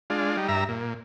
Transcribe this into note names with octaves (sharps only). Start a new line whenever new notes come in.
G#3 D4 F4
G3 D#4
G2 E5 A#5
A#2